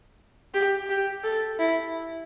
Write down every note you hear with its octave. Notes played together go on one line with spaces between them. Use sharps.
G4
G4
A4
E4